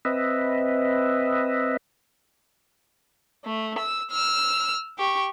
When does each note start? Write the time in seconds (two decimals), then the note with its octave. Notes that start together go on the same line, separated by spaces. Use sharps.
0.05 C4 B4 D#5 E5
3.45 A3
3.78 E6
4.11 E6 F6
4.98 G4 C#6